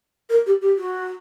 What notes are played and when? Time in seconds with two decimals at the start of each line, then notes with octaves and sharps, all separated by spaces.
0.30 A#4
0.46 G4
0.61 G4
0.77 F#4